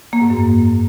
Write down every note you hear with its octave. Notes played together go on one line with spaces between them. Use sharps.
A#3
G#2
F#2